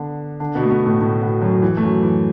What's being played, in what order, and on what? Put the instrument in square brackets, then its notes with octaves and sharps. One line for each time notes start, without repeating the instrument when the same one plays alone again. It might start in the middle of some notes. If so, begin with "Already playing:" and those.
Already playing: [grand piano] D3 B3 D4
D3 D4
B2 B3
A3
B2 B3
A2 A3
A2 A3
B2 B3
F#2 F#3
E3
A3
F#2 F#3
E3